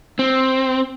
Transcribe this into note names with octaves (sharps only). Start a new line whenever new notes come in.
C4